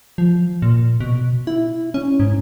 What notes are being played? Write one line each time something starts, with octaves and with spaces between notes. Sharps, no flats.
F3
A#2
B2
E4
C#4
G#2